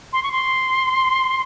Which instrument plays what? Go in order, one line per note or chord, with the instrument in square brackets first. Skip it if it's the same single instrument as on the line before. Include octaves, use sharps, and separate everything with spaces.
[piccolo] C6
C#6
C6